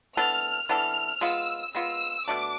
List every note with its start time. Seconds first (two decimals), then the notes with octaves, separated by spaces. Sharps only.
0.17 E3 B3 D4 A4 F6
0.69 E3 B3 D4 A4 F6
1.21 G#3 B3 F4 E6
1.75 G#3 B3 F4 E6
2.27 B2 A3 D4 D6